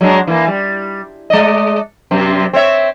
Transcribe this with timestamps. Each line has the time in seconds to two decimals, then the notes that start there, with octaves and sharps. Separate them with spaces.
0.01 F#3 G#3 D4
0.27 E3 A#3
0.48 G3
1.30 G#3 D5 D#5
2.11 F#2 C3 C4
2.53 C4 C#5 E5